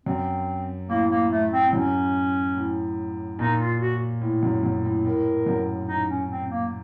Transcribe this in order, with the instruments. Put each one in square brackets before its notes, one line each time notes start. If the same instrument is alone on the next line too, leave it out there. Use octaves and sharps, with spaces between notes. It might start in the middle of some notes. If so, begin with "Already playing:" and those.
[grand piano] F#2 [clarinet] C4
[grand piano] A2 [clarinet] A#3
[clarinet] A#3
A3
C4
[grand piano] A2
[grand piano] F#2 [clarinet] C#4
[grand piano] A2
[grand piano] A#2 [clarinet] D#4
[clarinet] F4
F#4
[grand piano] A2
F#2
F#2
A2
[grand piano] A2 [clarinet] A#4
[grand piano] F#2
[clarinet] D#4
C#4
C4
A#3